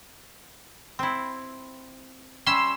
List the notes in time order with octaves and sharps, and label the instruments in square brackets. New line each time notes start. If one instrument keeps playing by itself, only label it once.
[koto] C4 E4
[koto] G3 C#4 E5 [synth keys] C6 E6